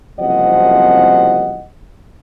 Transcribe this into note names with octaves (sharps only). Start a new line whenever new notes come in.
F#1 C2 C3 F3 D#5 F#5